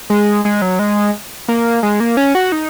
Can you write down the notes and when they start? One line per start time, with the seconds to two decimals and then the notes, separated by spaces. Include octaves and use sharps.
0.10 G#3
0.45 G#3
0.62 F#3
0.79 G#3
1.48 A#3
1.83 G#3
2.00 A#3
2.17 C#4
2.35 F#4
2.52 D#4